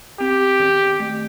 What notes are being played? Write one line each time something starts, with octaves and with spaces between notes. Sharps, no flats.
C4 G4
D#3
A3